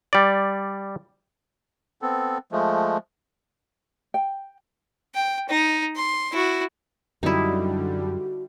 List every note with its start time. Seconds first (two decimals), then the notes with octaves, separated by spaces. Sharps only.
0.13 G3 D5
2.02 B3 C4 A4
2.52 F3 G#3 A3
4.14 G5
5.15 G5
5.49 D#4
5.96 C6
6.32 E4 F#4
7.23 F#2 D3 G3 D#4 E4 F#4